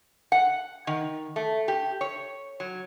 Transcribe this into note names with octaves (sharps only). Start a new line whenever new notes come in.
F#5
D#3
A3
G4
C#5
F#3